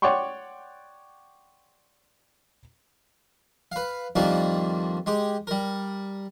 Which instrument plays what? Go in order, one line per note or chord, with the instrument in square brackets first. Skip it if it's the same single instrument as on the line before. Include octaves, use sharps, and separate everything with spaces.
[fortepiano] C#5 D5 F#5 G5 C6 C#6
[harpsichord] B4 F5
F2 D#3 G3 A#3 D4 F4
G#3 G4
G3 A#4